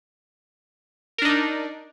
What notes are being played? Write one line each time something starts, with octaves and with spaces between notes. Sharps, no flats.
D4 D#4 A#4